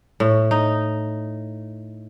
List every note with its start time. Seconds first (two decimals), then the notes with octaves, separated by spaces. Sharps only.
0.20 A2
0.51 D#4